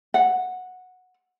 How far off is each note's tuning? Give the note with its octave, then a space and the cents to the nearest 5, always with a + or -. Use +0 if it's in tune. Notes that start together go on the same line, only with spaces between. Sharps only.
F#5 -10